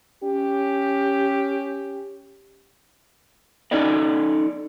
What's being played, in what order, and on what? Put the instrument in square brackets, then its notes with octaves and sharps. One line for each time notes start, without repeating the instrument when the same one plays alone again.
[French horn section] C#4 G4
[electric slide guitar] C#4 D#4 A4 D5 D#5